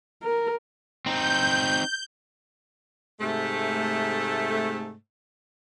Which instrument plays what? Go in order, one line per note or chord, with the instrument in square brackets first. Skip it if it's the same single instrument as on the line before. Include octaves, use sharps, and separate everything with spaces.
[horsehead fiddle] A#4
[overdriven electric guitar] C4 D#4 [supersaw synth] G6
[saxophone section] G#2 C3 A3